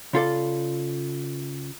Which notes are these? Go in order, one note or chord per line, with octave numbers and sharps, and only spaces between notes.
C#3 F4 A4 D5